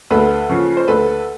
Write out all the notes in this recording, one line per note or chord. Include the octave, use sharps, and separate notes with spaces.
D2 A4 B4
C#3 F3
C5
D2 A4 B4